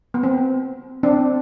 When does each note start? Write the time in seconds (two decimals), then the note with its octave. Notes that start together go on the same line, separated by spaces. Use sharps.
0.14 B3
0.23 C4
1.03 C4 D4